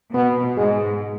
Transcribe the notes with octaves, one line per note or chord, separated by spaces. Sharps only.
B2 B3
G#2 G#3